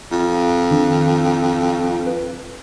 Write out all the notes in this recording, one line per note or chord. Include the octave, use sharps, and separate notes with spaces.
F2
D#3 D4
B4